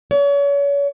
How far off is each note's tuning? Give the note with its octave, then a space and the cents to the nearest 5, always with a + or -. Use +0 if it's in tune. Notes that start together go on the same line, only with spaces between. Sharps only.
C#5 +35